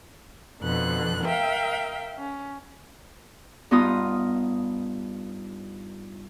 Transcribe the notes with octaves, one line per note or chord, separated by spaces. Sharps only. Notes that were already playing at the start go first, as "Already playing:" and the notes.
F2 B2 D3 F#6
A#4 E5 F5 G5
C#4
G2 B3 D#4 F4 D#6